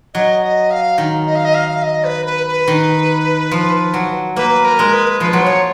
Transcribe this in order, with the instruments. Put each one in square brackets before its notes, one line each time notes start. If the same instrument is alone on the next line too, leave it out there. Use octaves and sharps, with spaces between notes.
[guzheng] F#3 [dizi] D#5
[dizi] D#5
F5
[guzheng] D#3
[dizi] D#5
F5
D#5
F5
D#5
B4
B4
B4
[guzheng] D#3
F3
F#3
[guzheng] A#3 [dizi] B4
[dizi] A#4
[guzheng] G#3
[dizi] B4
[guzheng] F3 [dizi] B4
[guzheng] F#3
[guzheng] F3 [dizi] C#5